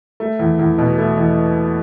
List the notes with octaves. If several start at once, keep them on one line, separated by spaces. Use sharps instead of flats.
A3
E2
E2
B2
A3
E2